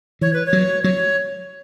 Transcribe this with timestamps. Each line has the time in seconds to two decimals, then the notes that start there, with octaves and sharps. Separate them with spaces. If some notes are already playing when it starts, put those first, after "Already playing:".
0.21 E3 C#5
0.33 B4
0.46 C#5
0.53 F#3
0.84 F#3 C#5